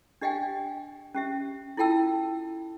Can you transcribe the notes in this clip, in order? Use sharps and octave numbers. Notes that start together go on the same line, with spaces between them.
D4 G4 D#5 F5 G5 G#5
C#4 G4 E5
E4 F4 A4 G5 A5 E6